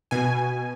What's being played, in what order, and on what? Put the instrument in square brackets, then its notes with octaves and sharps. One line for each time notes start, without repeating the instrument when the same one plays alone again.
[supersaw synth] B2 G#5